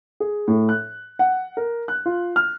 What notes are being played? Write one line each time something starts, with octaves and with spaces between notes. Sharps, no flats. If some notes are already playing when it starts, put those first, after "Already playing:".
G#4
A2
F#6
F#5
A#4
F#6
F4
F6